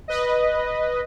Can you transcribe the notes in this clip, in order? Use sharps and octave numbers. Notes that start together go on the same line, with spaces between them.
B4 D#5